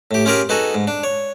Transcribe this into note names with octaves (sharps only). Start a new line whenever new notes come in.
A2 G4
C#4 F4 G4 G#4 A#4 F5
B3 D#4 F#4 G#4 A4
G#2
D4
C#5